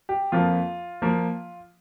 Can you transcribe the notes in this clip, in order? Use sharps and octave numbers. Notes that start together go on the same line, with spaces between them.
G4
F2 F3 A#3 F4
F3 A#3